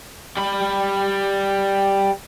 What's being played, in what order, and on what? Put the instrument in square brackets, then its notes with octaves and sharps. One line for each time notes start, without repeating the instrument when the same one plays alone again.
[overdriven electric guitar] G3 B5